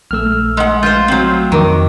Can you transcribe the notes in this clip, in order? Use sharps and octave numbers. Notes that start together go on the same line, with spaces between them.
A#1 A3 E6 F6
G#3 F#5
F4 C5 G6
F#3 C4
F2 D#3 A#5 C#6 D6